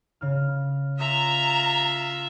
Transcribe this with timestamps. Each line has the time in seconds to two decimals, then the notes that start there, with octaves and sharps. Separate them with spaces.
0.21 C#3 F6
1.00 F4 E5 A#5